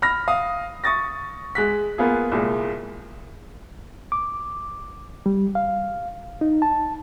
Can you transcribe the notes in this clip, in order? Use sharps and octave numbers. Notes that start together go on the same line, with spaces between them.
B5 F6 A#6
F5 D#6
C#6 D#6 A6 A#6
G#3 F#6 B6
A#3 B3 F4 G#4
C2 A#2 G#3
D6
G3
F5
D#4
A5